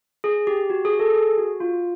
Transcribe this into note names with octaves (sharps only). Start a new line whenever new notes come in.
G#4
G4
F#4
G#4
A4
G#4
F#4
F4